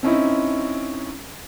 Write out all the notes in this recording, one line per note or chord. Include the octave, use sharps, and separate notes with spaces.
C4 C#4 D#4 E4